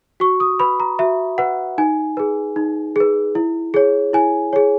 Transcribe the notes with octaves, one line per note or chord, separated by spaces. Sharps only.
F#4 C#6
D#6
B4 B5
A#5
F#4 E5
B4 F#5
D#4 G#5
G#4 B4
D#4
G#4 B4
E4
G#4 C#5
E4 G#5
G#4 C#5